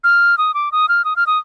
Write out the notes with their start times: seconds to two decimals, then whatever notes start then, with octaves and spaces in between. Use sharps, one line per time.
0.04 F6
0.38 D#6
0.54 D6
0.72 D#6
0.89 F6
1.05 D#6
1.16 F6
1.27 D#6